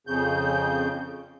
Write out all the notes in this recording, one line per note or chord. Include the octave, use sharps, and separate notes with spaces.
F2 C#3 G6